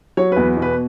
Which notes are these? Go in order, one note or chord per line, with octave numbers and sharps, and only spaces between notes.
F#3 C#5
E2 B4
B2
B4